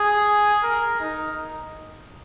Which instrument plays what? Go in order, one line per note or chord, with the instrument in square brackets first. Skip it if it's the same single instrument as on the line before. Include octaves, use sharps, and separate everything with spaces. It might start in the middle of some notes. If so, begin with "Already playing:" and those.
Already playing: [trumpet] G#4
A#4
D#4